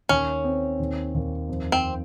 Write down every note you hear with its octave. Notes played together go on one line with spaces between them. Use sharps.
D#2 C#4
C4
D#2
D#2
F2
C4